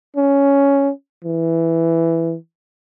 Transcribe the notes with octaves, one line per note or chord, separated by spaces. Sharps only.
C#4
E3